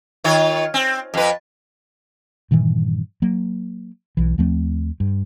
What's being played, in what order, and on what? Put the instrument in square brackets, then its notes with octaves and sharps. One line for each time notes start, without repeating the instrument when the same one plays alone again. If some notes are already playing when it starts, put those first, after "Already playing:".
[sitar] D#3 F4 C#5
C4
F2 B4
[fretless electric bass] G2 A#2 D#3 E3
F#3 A#3
B1 E3
D#2 F3 A3 C4
G2